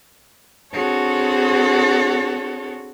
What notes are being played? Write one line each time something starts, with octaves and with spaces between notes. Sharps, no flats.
C4 D4 F#4 G#4 A4 C#5